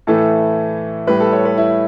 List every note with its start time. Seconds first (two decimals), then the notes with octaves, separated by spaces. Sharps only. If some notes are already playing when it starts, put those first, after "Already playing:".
0.07 A2 E3 A3 A4
1.07 A2 G3 B4
1.20 A4
1.33 C#5
1.45 B4
1.58 E4